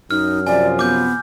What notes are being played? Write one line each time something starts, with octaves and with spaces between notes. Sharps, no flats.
F#2 D#4 F6
C3 F3 D5 G#5
B3 D6 G6